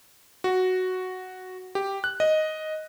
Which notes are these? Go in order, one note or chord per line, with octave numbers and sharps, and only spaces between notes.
F#4
G4
F#6
D#5